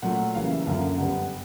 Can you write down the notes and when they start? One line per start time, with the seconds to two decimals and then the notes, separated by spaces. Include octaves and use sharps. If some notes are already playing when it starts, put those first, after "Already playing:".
0.02 A#2 F#3 A3 F#5
0.35 C#3 E3 G3 A#3 F5
0.51 E5
0.66 F#2 D3 F3 A#3 F5
0.98 G2 D3 G3 B3 F#5